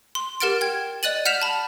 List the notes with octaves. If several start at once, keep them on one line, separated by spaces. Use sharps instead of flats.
C6
G4 A#4 F#5 F6 A6 D7
G5 G#6
D5 D#5 F#6 A6 D#7 F#7
F#5 F6 G6 B6 E7 F7
A5 B5